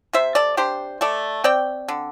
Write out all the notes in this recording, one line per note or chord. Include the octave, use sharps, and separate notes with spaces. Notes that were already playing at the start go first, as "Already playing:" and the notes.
C3 C5 E5
A4 D5
D4 G4 C5
A3 A4 D5
C4 D5 G5
D3